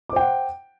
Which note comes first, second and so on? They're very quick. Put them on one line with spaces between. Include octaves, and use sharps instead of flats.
D6 C5 G5 F#5